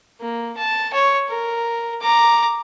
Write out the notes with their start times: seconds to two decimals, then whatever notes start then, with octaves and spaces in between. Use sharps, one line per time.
0.21 A#3
0.57 A5
0.93 C#5
1.29 A#4
2.02 A#5 D6